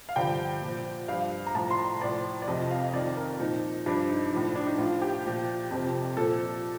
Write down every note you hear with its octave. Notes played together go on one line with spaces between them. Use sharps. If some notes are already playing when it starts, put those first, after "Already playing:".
F5
G2 D3 F3 G5
A#2
F3
G2 F3 F5
A#5
A2 F3 A5
C6
A#5
A2 F3 D5
D5
F2 C3 F3 D#5
F5
D#5
F2 D#3 D5
A#4
A#2 F3 D#4
G2 F3 D4
D#4
A2 F3
D4
D#4
A2 F3 F4
G4
A#2 F3
F2 C3 F3
A#2 F3 A4